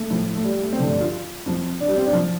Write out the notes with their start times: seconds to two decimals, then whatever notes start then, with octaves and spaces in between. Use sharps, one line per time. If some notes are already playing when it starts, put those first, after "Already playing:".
Already playing: A3
0.10 A2 F3
0.36 A3
0.44 G3
0.61 A3
0.72 C4
0.78 G2 D3 F3 A3
0.90 D4
1.01 F4
1.46 F2 F3
1.80 D4
1.88 G3
1.96 C4
2.06 D4
2.13 F3